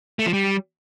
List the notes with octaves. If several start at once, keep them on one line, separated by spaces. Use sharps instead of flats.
A3
F3
G3